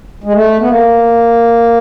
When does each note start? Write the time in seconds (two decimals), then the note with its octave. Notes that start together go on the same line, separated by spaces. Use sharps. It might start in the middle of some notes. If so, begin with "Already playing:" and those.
0.24 G#3
0.33 A3
0.60 B3
0.68 A#3